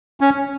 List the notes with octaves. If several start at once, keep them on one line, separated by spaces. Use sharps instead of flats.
C#4